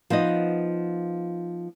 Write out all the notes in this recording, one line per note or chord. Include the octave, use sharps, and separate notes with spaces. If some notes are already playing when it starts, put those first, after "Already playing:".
F3 B3 D#4 D#5